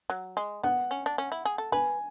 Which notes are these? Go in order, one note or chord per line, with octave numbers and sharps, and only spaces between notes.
F#3
G#3
B3 F#5
C#4
D4
C#4
E4
G#4
A4
B4 G#5